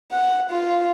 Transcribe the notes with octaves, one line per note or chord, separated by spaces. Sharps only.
F#5
F4